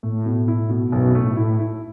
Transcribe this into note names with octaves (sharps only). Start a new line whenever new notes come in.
A2 A3
B2
E4
B2
B1 F#2 B2
A2 A3
A2 E4
E4